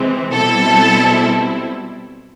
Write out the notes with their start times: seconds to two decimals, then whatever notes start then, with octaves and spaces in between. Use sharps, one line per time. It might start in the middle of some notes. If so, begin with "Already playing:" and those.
Already playing: C3 E3 G#3 C4
0.35 B2 G3 C4 E4 A4